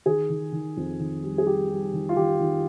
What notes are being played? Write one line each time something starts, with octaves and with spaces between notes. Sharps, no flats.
D#3 G#4
D#3
D#3
F2
D#3
G3
G#4
G3 G4
G3
D#3
F4
D#3 G4
D#3